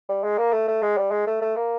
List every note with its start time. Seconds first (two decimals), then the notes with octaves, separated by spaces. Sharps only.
0.09 G3
0.24 G#3
0.38 A#3
0.52 A3
0.68 A3
0.82 G#3
0.97 G3
1.11 G#3
1.27 A3
1.42 A3
1.56 A#3